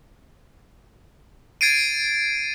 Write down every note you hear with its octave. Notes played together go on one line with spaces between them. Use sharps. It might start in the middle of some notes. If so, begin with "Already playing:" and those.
G#6 A6 C7 D7 D#7